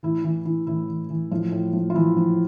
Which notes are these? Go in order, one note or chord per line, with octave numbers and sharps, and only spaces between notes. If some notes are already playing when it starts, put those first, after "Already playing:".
A2 E3 E4
E3 E4
E3 E4
A2 E3 E4
E3
E3
A2 F3 F4
A2
F3
F4
E3 F3 E4
F3